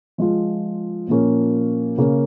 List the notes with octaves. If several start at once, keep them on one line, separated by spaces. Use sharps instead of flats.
F3 G#3 F4
A#2 F3 A#3 C#4
C#3 A#3 C#4